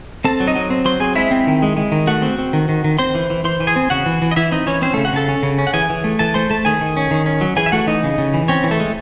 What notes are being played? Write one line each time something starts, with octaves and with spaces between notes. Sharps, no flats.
C4 A4 A5
F#3
D#4 D#5
F#3
C4
F#3 C5 C6
C4 G#4 G#5
G#3 E4 E5
C4
D#3
G#3
G#3
D#3
A3 F#4 F#5
C4
C4
D#3
D#3
D#3
C4 C5 C6
E3
E3
E3 C5 C6
E3
G#4 G#5
C4
C#3 F#4 F#5
E3
E3
D#5
E3 E4 E5
C4 D#4 D#5
E3 C#4 C#5
C4 C#4 C5
C#3 A3 A4
F#4 F#5
C#3 A4 A5
C#4
C#3
C#4
F#5
E3 G#4 G#5
E3
A3
E3 A4 A5
A3 C5 C6
A3 A4 A5
D#3 G#4 G#5
D#3
C#4
D#3
C#4
F#3
E3 G#4 G#5
E5
A3 F#4 F#5
E3 D#4 D#5
C#3
C#3
E3
C4 C#4 C#5
E3
A3 A4
G#3